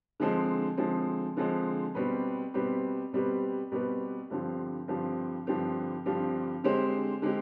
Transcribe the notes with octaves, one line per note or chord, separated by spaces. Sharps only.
D3 F3 G#3 C4
D3 F3 G#3 C4
D3 F3 G#3 C4
B2 G3 C4 G4 B4
B2 G3 C4 G4 B4
B2 G3 C4 G4 B4
B2 G3 C4 G4 B4
G2 D3 F3 C4 G4
G2 D3 F3 C4 G4
G2 D3 F3 C4 G4
G2 D3 F3 C4 G4
D3 G#3 C4 G4 C5
D3 G#3 C4 G4